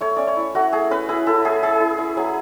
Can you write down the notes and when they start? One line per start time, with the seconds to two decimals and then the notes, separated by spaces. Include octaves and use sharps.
0.01 A3 C#5
0.16 C#4 D5
0.27 C#5
0.37 E4
0.55 A3 F#4
0.72 A3 G#4
0.91 C#4 B4
1.09 E4 G#4
1.27 E4 A4
1.45 A3 G#4
1.62 A3 G#4
1.81 E4
1.99 E4
2.17 F#3 G#4